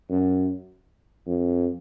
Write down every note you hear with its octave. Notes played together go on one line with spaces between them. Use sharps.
F#2
F2